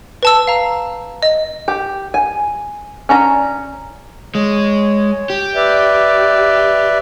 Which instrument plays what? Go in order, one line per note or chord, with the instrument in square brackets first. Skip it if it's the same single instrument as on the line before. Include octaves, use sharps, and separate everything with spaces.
[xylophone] B4 A5 E6
F5 A#5
D#5
[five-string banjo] G4
G#5
C#4 D5 A#5
[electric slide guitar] G#3 [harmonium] C#5
[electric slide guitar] G4
[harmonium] B4 D5 E5